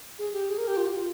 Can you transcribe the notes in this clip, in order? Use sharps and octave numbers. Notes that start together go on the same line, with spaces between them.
G#4
G4
G#4
A#4
G4
F4
G4
F4